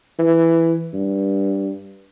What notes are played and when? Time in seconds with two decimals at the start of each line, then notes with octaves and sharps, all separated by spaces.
0.19 E3
0.94 G2